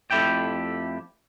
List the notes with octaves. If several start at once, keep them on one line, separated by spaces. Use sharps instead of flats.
F2 A3 E4 G4 G5